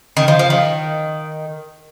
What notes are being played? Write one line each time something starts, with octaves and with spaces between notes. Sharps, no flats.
D#3
F3
F3
D#3